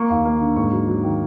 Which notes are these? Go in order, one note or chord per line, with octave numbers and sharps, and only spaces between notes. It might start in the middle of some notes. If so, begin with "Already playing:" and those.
Already playing: A#3 C#6
D#2
A#3
D3
G#2 C#6
F#3
F#3
D#3